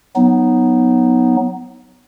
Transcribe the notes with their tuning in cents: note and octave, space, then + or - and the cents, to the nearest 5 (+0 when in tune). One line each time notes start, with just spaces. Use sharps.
F#3 -10 B3 +0 D#4 +0